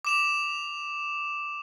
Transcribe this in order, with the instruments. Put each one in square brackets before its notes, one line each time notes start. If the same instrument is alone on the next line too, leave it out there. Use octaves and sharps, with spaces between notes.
[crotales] D6 E7 F7